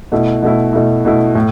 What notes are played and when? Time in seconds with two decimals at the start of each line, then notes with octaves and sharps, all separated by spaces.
0.12 B2 A3 E4
0.43 B2 A3 E4
0.73 B2 A3 E4
1.05 B2 A3 E4
1.35 A2